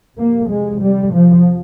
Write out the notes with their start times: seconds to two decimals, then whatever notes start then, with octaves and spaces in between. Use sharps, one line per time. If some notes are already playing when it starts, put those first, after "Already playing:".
0.18 F2 C3 A#3
0.50 G#3
0.82 G3
1.14 F3